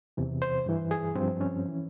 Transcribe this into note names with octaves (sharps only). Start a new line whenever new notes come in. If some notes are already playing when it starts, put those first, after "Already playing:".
E2 C3 E3
C5
G2 E3
G#4
G2 F3 C4
C#4
E3